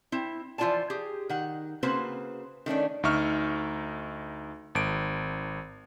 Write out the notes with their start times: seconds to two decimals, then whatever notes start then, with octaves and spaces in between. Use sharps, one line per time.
0.12 C4 E4
0.58 E3 F3 F4 D5 G#5 A5
0.90 G4 G#4
1.29 D#3 F#5
1.83 C#3 A#3 C4 F#4 B4 C5
2.66 D#3 A3 C#4 D4
3.03 D2 D#4 E5 C#6 F6
4.75 G#1 D7